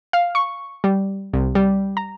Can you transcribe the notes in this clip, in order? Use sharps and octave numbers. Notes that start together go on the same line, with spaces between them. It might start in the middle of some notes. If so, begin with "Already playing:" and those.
F5
C#6
G3
C2
G3
A#5